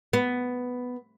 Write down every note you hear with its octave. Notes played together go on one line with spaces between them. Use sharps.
B3